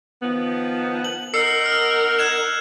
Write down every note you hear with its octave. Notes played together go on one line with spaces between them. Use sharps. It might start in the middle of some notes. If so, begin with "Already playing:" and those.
D#3 F3 B3
F#7
B3 D#4 A#4 E6 C7 C#7
E6 F6
F#6 G#6 E7